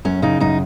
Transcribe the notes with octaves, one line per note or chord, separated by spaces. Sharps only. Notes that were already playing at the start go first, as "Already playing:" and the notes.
F#2 C#4
C#3 D#4
F#2 D#4